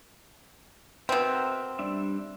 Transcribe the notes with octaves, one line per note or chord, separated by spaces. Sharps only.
B2 C4 A#4 E5 F#5
G3 D4 E5